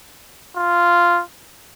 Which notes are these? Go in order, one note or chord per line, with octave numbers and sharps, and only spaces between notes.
F4